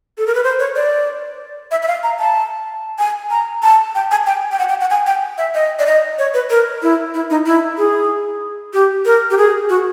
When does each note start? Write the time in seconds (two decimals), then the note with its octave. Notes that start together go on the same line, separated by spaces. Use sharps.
0.18 A4
0.27 A#4
0.35 B4
0.44 C5
0.59 C#5
0.76 D5
1.71 E5
1.82 E5
1.88 F5
2.03 A#5
2.20 A5
2.99 G#5
3.31 A#5
3.63 A5
3.95 G5
4.11 G#5
4.26 G5
4.52 G5
4.59 F#5
4.69 G5
4.81 F#5
4.90 G#5
5.07 G5
5.38 E5
5.55 D#5
5.79 D5
5.86 D#5
6.19 C#5
6.34 B4
6.50 A#4
6.83 E4
7.14 E4
7.30 D#4
7.46 E4
7.78 G#4
8.74 G4
9.06 A#4
9.30 G4
9.38 G#4
9.69 F#4